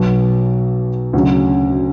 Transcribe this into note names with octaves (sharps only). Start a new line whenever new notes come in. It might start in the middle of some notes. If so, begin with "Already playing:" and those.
Already playing: B1 B2 F#3
D2 C#3 F#3